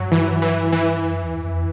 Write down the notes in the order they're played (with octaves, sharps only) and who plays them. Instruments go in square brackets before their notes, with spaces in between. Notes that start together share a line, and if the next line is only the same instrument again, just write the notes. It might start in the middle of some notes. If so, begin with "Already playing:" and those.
Already playing: [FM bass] G2 [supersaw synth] F#3
[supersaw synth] E3
E3
E3
[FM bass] F#2
E2
F2